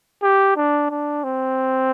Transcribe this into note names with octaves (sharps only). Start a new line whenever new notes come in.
G4
D4
D4
C4